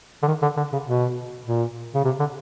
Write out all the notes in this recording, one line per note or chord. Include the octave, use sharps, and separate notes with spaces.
D3
D#3
D3
D3
C#3
B2
A#2
C#3
C3
D3